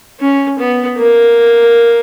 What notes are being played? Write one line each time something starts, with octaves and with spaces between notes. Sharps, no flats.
C#4
B3
A#3